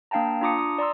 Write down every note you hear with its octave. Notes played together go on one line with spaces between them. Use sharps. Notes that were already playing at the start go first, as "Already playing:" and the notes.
A#3 D4 F5 G5 A5 A#5
D4 F4 A#5 D6 D#6 C#7
D#6
D5 A#5 C6 E6